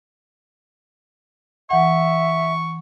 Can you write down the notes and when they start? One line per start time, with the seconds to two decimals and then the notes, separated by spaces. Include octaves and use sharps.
1.70 E3 E5 F#5 C#6